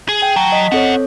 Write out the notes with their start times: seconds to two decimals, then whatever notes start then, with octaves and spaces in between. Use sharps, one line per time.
0.08 G#4
0.22 G5
0.36 F#3 A5
0.52 D#5 B6
0.72 C4 C#4 A4 C#5 F#5